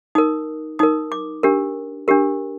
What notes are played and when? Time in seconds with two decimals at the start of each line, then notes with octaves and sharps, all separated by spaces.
0.15 D#4 A#4 D#6
0.79 D#4 A#4 D#6
1.12 D6
1.43 D4 G4 A#4
2.08 D4 G4 A#4